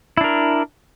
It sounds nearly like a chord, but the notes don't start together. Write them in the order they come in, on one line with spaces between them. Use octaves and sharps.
E4 D4 A#4